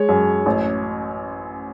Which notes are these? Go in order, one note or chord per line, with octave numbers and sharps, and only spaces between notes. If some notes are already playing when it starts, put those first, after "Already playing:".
Already playing: G#3 C#5
F#2
A1